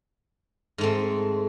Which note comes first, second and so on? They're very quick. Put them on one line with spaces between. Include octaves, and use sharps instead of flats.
G#2 A3 C4